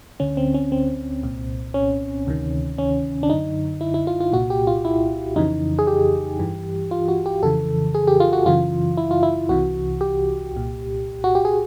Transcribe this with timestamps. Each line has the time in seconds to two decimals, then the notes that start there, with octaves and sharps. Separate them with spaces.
0.20 D2 D3 C#4
0.37 C4
0.54 C#4
0.72 C4
1.23 C2 A#2
1.74 C#4
2.27 D2 C3 D#3
2.78 C#4
3.23 D4
3.29 F#2 D3 D#4
3.81 E4
3.94 E4
4.07 F4
4.21 F4
4.32 C2 A#2 F#4
4.50 G4
4.67 F4
4.85 E4
5.36 F2 C#3 E3 D#4
5.79 G#4
5.87 G4
6.39 G2 E3
6.91 F4
7.08 F#4
7.26 G4
7.42 F2 C#3 E3 A4
7.94 G#4
8.07 G4
8.20 F4
8.33 F#4
8.46 F#2 C#3 E3 F4
8.97 E4
9.11 F4
9.23 E4
9.49 C2 C3 E3 F#4
10.01 G4
10.53 C2 A#2
11.24 F#4
11.35 G4
11.45 G#4